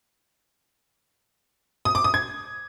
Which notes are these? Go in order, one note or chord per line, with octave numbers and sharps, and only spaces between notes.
D#6
D6
D#6
G#6